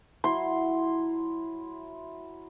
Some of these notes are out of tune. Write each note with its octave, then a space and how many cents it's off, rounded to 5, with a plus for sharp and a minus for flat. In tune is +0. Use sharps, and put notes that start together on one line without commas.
F#3 +0 E4 +0 C6 +0